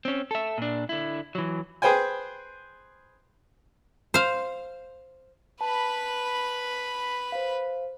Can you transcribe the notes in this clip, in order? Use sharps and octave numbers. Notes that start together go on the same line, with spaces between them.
C4 C#4
A4 E5
A#2 D4
D3 E4
E3 F#3
G#4 B4 C5 G5 G#5
C5 F5
B4 A5 B5
C5 F5